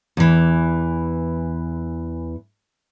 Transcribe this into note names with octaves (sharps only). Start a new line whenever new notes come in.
E2 E3